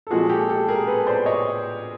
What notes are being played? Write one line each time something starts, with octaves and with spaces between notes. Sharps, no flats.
A4
A#2 F3 G#3 F#4 G#4
G4 A4
G4 A4
G#4 A#4
A4 B4
C5 D5
C#5 D#5